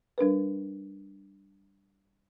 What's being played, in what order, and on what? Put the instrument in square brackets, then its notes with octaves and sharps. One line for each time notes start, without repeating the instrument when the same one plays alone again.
[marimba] G3 D4 A#4 B4